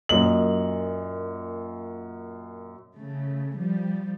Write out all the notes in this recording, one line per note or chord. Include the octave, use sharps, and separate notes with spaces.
F#2 A#2 D#5 F#7
C#3 A3
F3 G3